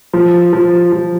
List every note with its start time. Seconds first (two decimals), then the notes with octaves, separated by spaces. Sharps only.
0.13 F3
0.53 F3
0.92 F3